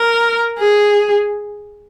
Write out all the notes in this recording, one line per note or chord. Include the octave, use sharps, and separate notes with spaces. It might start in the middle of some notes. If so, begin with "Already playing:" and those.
Already playing: A#4
G#4